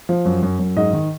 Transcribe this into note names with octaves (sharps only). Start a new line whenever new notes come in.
F3
F#2
F#2
F#2
G#2 D#5
D#3